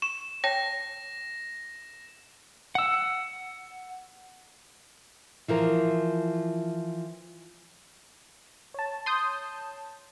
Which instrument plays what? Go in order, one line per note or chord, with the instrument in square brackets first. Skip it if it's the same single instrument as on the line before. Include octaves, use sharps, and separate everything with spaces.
[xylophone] C#6 [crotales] E7
[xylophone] C#5 G5 A5 [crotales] A#6
[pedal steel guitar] F#5 E6
[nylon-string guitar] E3 F3 A#4
[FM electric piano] C#5 A5
[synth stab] C6 D#6 G6